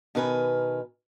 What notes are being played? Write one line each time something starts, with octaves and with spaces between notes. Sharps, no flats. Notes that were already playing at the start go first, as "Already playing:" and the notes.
B2 D#3 A#4 B4 D5 G#5